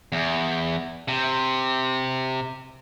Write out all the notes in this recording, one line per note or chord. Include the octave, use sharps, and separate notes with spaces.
E2
C3